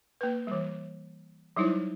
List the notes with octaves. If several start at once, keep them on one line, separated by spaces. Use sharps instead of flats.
A#3 B4
E3 G3
F#3 G3 D#4 E4 C5 C#5